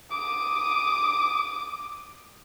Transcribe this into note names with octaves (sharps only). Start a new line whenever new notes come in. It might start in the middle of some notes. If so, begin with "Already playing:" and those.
D6 D#6